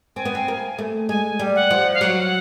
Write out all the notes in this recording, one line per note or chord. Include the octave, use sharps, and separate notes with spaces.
C4 G#5
B3
C4
A#3
A3
G#3 G#5
G3
F#5
F3
F5
F#3 F#5